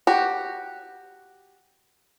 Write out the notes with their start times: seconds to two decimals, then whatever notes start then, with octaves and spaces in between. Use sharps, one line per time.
0.07 F#4 G4